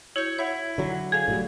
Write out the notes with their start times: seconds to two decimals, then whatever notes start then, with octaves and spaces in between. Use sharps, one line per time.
0.16 E4 F#4 C#5 G6
0.39 E4 C#5 F#5
0.78 D3 F#3
1.12 G#4 A4 F5 G#6
1.28 A2 F#3 G3